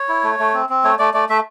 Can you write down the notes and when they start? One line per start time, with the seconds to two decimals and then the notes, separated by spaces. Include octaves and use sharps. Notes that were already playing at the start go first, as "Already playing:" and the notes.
Already playing: C#5
0.09 E4
0.24 A3
0.39 A3
0.54 C4
0.69 C4
0.84 A3 C#5
0.99 A3 D5
1.14 A3 D5
1.29 A3 E5